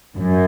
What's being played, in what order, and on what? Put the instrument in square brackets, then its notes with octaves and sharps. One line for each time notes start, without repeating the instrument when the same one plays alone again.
[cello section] F#2